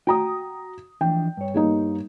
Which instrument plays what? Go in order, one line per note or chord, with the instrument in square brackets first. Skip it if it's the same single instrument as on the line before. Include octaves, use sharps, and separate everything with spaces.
[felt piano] F#4 A#5 D#6 [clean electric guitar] G5
[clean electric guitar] E3 F3 D4 [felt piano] G5
[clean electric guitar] G2 C#5
[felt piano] G3 A#3 D#4